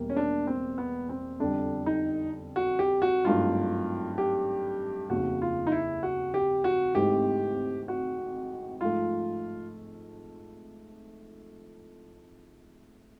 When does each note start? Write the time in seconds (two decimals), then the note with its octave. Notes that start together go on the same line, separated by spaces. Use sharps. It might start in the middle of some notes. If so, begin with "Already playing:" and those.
Already playing: E1 E2 B2 G3 A#3
0.10 C#4
0.16 D4
0.47 C4
0.78 B3
1.09 C4
1.40 F2 D3 G3 D4
1.86 D#4
2.56 F#4
2.79 G4
3.02 F#4
3.25 G#1 G2 D#3 F#3 A3 F4
4.18 G4
5.10 F1 D#2 C#3 F#4
5.42 F4
5.67 D#4
5.72 E4
6.03 F#4
6.34 G4
6.64 F#4
6.95 G#1 G#2 E3 A3 C4 G4
7.88 F#4
8.81 G#2 F3 A3 F4